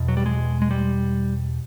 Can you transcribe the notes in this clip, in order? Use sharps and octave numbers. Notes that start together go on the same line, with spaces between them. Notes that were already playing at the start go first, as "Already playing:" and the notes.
Already playing: E2 B2
F#3
G3
G#3
G#3
G3